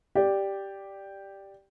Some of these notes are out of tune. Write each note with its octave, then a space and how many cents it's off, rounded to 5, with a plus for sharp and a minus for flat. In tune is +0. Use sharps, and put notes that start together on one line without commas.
G4 +0 D5 +0